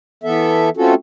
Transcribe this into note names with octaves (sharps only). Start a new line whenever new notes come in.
E3 B3 A4 E5
A3 C4 C#4 F4 F#4 A4